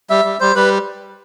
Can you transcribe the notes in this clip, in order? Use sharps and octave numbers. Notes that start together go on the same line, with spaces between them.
G3 E5
G3
G3 C5
G3 B4